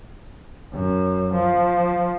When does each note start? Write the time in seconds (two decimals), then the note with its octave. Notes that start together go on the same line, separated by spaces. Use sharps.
0.73 F#2
1.35 F3